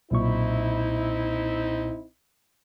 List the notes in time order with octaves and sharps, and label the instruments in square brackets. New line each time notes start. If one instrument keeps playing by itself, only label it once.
[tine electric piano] B1 A#2 C#6 [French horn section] C4 D#4 E4